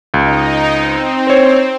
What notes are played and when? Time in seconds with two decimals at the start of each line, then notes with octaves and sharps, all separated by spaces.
0.14 C#2 D#4
0.74 C4
1.27 C5 C#5